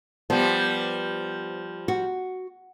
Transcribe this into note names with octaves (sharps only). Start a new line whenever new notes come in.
F3 G3 B3
F#4